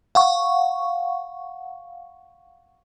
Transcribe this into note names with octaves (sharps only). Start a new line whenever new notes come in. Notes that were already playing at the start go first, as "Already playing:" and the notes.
F5 F#5 C#6